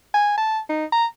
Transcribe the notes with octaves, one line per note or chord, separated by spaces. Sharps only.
G#5
A5
D#4
A#5